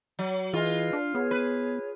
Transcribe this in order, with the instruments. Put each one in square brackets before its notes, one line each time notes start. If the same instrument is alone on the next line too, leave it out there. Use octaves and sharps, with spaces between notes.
[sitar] F#3
[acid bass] E3 [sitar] F4 [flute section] G#4 B4 D#5
[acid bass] D4
[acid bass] B3 [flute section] G#4 C#5
[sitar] B4